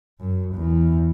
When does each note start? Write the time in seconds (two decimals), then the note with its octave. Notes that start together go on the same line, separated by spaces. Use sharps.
0.20 F#2
0.55 E2